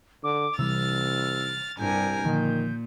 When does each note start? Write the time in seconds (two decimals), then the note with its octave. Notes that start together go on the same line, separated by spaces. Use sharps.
0.24 D3 D6
0.59 C2 C3 E3 G3 E6 F6 A6
1.79 C2 G2 A#4 G#5 G6
2.25 A#2 D3 D#3 F3